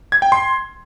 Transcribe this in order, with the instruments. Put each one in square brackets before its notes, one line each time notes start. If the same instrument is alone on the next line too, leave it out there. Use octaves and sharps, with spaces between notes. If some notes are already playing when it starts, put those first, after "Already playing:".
[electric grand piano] G#6
G5
C6